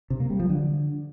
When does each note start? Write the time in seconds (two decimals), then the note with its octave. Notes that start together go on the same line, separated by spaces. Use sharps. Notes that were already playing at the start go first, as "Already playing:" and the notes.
0.10 C3
0.20 A#3
0.30 G3
0.40 F3
0.49 D3